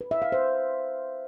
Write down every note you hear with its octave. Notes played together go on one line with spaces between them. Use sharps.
B4
E5
F5
C5